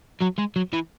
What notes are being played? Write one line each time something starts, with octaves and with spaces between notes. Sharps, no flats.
F#3
G#3
F#3
E3